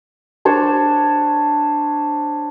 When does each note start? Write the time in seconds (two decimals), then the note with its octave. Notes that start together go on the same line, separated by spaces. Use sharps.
0.45 D4 C5 C#5